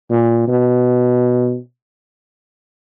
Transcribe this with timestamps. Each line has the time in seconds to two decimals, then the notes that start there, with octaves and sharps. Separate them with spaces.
0.11 A#2
0.48 B2